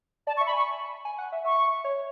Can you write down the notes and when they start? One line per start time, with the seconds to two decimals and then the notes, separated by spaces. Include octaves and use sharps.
0.27 D5 A5
0.37 C#6
0.41 E5
0.47 B5
0.53 G#5
0.56 C#6
1.05 G#5
1.18 F#5
1.32 E5
1.44 E5 C#6
1.84 C#5